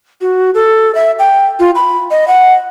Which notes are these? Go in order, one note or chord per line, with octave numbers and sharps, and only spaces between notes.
F#4
A4
E5
G5
F4
B5
D#5
F#5